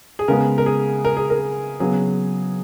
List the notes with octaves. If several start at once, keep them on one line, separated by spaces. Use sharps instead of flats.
G#4
C#3 G#3 B3 A#4
A#4
G#4
A#4
G#4
A#4
C#3 F#3 B3 G#4